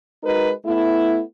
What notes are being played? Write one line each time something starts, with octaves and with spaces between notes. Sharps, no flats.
G#3 D#4 F#4 A#4 B4
A3 B3 E4